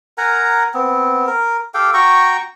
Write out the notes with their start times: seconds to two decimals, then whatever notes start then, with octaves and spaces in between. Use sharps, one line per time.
0.18 A#4 F#5 G#5 A#5
0.74 B3 C4
1.27 A#4
1.74 G4 A4 F5 G5
1.94 F#4 G5 A#5 C#6